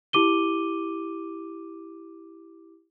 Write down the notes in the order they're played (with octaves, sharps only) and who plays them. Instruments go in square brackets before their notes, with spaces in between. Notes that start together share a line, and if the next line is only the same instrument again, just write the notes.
[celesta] E4 G4 D6 D#7 G7